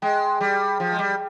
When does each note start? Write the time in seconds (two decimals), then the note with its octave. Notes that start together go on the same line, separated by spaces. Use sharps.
0.02 G#3 G5
0.41 G3
0.80 F3
0.92 G#3
0.99 G3